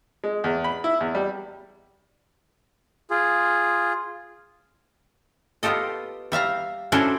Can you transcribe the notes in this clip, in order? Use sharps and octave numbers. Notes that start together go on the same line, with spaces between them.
G#3
E2
B5
E4
E2
G3
F4 G#4
B3 F4 G4 A4 D#5
G3 E5 F5 A#5
C#4 D4 E4 F#4 A4 C5